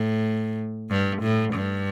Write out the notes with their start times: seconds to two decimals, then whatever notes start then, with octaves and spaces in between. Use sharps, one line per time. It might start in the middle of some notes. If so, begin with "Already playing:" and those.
Already playing: A2
0.91 G2
1.23 A2
1.54 G2